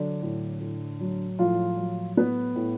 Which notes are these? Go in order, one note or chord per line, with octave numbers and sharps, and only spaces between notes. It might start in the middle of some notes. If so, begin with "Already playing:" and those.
Already playing: D3 F#3 D4
A2
A2
F#3
A2 F3 F4
F#3
A2 B3 B4
A2